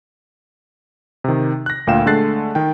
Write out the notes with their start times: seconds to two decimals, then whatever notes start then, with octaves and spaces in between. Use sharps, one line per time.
1.24 C3 D#3
1.66 F#6 A#6
1.87 D2 A#2 F5 G5 E7
2.06 D3 G#3 A3 F#6 A6 C7
2.55 D#3 G5